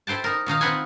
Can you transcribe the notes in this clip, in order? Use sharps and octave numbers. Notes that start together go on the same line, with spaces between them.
E4 A4 C5 G5 A5
D#4 A#4
A#2 D#3 D#4 F5
C4 D#4 F4 B4 F#5 G#5